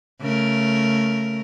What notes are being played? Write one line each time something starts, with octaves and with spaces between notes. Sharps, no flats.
C#3 A3 A#4